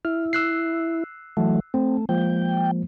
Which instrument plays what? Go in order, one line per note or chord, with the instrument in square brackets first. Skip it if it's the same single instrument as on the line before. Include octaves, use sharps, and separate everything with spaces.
[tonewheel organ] E4 [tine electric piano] F6
[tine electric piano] E6 F#6 C7
[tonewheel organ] E3 F#3 A3
[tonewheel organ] A3 [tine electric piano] C4
[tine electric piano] F3 G#3 A#3 [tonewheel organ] G5